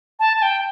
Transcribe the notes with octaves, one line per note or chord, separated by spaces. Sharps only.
A5
A5
G5